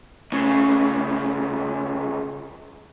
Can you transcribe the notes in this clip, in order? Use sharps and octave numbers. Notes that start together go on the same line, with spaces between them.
D2 C#3